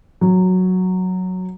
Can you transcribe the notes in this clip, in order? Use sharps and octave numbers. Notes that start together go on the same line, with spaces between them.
F#3